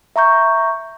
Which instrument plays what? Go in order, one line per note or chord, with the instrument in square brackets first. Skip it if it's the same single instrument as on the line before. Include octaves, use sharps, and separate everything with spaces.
[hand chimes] E5 A#5 C#6 G6